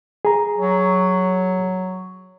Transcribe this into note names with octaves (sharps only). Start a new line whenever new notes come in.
G#4 A#5
F#3